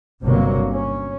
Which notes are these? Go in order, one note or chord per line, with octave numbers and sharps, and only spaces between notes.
G1 C3 F#3 A#3
C#4